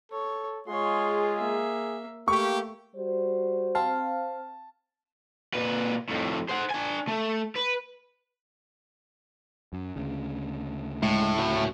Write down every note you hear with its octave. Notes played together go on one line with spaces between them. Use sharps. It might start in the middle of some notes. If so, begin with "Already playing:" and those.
A4 C#5
G#3 F4 G#4 C#5 C6
A#3 E5
A3 A#3 G4 C#6
G3 F#4 C5
C4 F5 A5
A#2 B4
F2 A2
C5 F#5
D4 G#5
A3
B4
F#2
D2 C#3
A2 G#3
F#4 C#5 E5